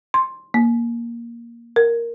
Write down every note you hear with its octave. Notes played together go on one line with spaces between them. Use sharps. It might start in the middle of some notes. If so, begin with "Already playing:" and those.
C6
A#3
A#4